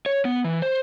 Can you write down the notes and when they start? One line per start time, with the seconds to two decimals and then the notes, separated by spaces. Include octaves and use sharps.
0.06 C#5
0.25 B3
0.44 E3
0.62 C5